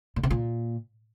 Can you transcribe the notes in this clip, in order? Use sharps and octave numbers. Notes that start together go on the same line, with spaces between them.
A#2
C3
A#2